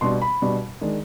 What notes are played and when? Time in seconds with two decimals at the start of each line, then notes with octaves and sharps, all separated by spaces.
0.01 B2 G3 D4 C6
0.22 B5
0.42 B2 G3 D4
0.81 D#3 G#3 D4